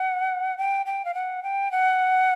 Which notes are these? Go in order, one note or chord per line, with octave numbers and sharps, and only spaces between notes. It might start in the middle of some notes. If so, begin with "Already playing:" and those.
Already playing: F#5
G5
G5
F5
F#5
G5
F#5